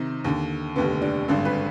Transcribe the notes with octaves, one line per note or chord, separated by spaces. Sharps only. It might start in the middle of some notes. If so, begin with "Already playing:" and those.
Already playing: C3 D#3 D#4
D#2 D3
F1 D#2 D3 B3
D4
G#1 G2 D3
B4